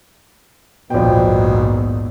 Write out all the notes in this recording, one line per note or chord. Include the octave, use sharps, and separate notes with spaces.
A#1 D#2 G#2 B2 G5